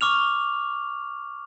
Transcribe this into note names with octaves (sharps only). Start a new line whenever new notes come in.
C#6 D6 F6 F7